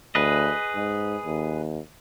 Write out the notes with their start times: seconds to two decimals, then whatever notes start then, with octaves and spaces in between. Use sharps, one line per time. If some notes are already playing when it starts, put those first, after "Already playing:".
0.15 D2 G#4 B4 D#5
0.75 G#2
1.24 D#2